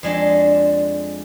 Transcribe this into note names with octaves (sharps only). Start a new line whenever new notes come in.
F2 G#3 D4